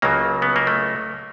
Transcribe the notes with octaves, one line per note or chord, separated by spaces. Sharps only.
C#2 C#3 F#3 A#3
B3
A#3
A3